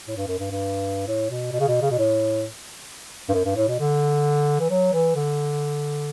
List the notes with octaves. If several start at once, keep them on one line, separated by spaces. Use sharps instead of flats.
A2
G2
F#2
G2
G2
A2
B2
B2
C#3
B2
C#3
B2
A2
G2
F#2
G2
A2
B2
D3
E3
F#3
E3
D3